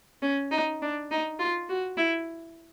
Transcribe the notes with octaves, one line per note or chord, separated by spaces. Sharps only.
C#4
D#4
D4
D#4
F4
F#4
E4